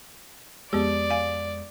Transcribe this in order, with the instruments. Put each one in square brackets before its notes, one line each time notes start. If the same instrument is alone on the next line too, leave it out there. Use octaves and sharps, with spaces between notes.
[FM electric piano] F2 G#3 [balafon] B3 G4 [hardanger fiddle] D5
[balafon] F5 G#5